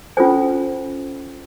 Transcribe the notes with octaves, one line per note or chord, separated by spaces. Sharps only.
C#4 F4 A4 C5 G#5